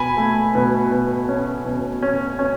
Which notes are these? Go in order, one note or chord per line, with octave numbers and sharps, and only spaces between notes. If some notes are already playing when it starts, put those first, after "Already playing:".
Already playing: B2 G#5 B5
A3
B2
B2
C#4
B2
C#4
C#4